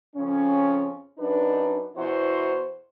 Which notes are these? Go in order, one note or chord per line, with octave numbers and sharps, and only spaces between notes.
F2 C#3 C#4
F#2 D4 D#4 B4
E2 B2 E4 F#4 C5